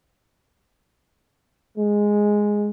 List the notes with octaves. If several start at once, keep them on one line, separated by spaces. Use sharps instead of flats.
G#3